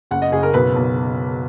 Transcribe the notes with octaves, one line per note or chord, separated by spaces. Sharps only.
F#1 F#5
D#5
F#1 G#4
A#4
B1 B4
B1